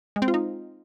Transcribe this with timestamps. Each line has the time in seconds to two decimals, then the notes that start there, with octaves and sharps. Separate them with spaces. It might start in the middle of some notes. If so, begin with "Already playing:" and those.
0.16 G#3
0.22 C4
0.28 F4
0.34 D#4